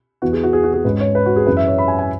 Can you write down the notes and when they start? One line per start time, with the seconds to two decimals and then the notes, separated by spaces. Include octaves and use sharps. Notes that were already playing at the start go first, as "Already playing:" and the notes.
0.22 E2 E3 B3 F#4
0.33 G#4
0.43 F#4
0.53 G#4
0.63 F#4
0.73 G#4
0.84 G#2 G#3 C#4 B4
1.00 C#5
1.15 B4
1.26 F#4
1.36 G#4
1.46 F#2 E3 C#4 B4
1.57 E5
1.67 C#5
1.78 B5
1.88 G#5
1.99 G#5